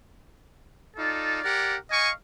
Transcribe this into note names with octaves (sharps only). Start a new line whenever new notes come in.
D#4 F4 A4 D5
G4 A#4 D5 F#5
D#5 F5 G#5 C#6